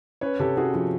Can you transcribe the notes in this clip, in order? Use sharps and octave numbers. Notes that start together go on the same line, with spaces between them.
C#4 B4 C#5
C3 G4 A4
C#4 F#4 G#4
F3 F#4